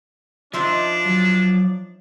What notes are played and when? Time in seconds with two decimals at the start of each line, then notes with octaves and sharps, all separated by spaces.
0.53 F3 D4 D#4 C5 E5
1.05 F#3